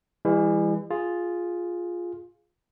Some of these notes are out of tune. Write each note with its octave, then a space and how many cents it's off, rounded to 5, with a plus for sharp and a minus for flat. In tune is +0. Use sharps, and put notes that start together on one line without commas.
E3 +0 G3 +45
F4 +5 G#4 +0